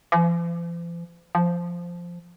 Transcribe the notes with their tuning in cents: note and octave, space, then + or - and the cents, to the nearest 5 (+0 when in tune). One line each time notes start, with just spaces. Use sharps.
F3 -45
F3 -5